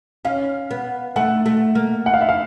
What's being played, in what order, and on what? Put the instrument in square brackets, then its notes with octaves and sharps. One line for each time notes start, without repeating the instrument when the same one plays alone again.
[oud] C#4 [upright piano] F5
[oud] B3
[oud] A3 [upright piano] F#5
[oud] A3
A#3
[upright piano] F#5
F5
E5
F5